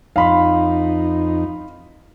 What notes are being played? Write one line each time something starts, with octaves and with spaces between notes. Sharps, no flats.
F2 D#4 F5 B5 C6